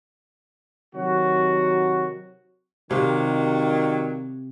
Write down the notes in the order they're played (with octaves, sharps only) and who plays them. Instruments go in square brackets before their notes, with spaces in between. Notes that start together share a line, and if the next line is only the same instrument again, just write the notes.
[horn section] C3 D#3 F#3 F#4
[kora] C3 [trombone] D#3 [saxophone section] F#3 G3 A#3